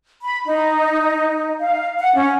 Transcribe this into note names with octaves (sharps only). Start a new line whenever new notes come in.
B5
D#4
F5
F#5
C#4